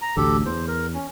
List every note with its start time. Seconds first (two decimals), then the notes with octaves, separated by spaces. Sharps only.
0.02 A#5
0.17 A1 D2 G4 A4
0.45 E2 C5
0.68 A#4
0.94 C#4